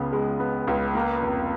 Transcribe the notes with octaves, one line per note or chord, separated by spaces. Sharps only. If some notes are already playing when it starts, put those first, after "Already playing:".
Already playing: C#2 C#3 B3
G#3
B3
C#2
A#3
F1